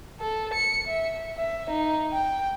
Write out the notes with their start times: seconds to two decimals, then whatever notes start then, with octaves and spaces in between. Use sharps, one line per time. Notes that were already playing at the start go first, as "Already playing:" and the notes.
0.20 A4
0.54 C#7
0.87 E5
1.36 E5
1.70 D#4
2.13 G5